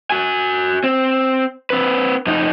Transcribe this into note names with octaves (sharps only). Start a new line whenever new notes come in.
F#4 G#5
C4
C4 B4
F2 D#4